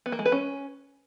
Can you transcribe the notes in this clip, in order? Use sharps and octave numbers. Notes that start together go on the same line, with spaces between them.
B3
A#3
G#3
B4
C#4